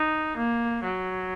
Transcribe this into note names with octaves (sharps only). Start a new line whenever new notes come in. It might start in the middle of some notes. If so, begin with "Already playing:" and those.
Already playing: D#4
A#3
F#3